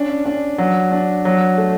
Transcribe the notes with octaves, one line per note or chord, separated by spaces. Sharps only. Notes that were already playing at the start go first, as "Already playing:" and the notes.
Already playing: C#4 D4
D4
F#3
D4
F#3
A3